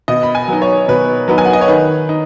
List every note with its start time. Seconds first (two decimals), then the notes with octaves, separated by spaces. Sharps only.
0.08 B2 D#5
0.23 B5
0.35 G#5
0.48 F#3 B3 D#4
0.62 C#5
0.88 B2 B4
1.28 F#3 B3 D#4 B4
1.38 G#5
1.45 F#5
1.53 D#5
1.61 C#5
1.68 D#3 B4
2.09 D#4